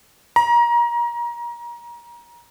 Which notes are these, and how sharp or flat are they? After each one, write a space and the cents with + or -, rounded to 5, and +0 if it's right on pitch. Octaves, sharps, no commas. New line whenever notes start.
A#5 +30